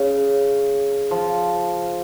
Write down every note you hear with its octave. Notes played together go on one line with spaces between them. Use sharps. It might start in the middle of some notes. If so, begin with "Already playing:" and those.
Already playing: C#3
F3